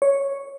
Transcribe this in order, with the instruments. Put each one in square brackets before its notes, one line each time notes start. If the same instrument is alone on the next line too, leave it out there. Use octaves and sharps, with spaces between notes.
[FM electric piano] C#5